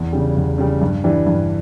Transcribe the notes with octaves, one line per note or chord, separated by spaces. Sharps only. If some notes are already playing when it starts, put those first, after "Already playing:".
Already playing: E2
C#3 G3
E2
C#3 G3
G2
E3 G3 D4
G2